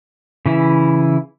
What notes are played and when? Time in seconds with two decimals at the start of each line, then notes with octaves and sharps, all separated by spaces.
0.46 C#3 E3 E4